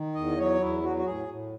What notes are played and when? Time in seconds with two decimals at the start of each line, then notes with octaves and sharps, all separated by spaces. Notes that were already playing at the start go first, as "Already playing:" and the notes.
Already playing: D#3
0.15 E2 D#5
0.38 F#3 C#5
0.61 E2 E4
0.83 F#3 F#4
0.97 F#4
1.06 A2 G#4
1.28 A2